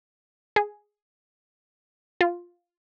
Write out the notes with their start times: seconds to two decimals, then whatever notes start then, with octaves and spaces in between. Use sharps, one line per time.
0.56 G#4
2.21 F4